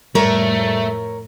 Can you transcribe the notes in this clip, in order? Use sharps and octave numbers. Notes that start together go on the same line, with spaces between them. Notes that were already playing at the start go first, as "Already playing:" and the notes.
F2 A2 G3 A3 A#4 C#5